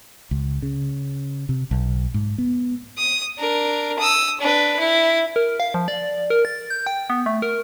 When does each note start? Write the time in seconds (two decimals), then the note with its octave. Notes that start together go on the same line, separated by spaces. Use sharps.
0.31 C#2
0.62 C#3
1.49 C3
1.71 B1
2.14 G#2
2.38 B3
2.98 D#6
3.38 D4 A#4
3.99 D#6 E6
4.40 D4 B4
4.79 E4
5.36 A#4
5.60 F5
5.74 F3
5.88 D5
6.30 A#4
6.45 A6
6.70 G6
6.87 G5
7.10 B3
7.26 A3
7.42 A#4